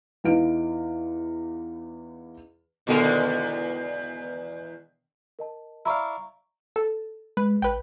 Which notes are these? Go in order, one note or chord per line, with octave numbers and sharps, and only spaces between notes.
E2 E3 D#4 B4 F5 D7
E2 B2 D3 D#3 G#3 A#4
A#4 D#5 A5
E4 D5 F5 A#5 C#6
A4
G#3 B4
A1 B4 G5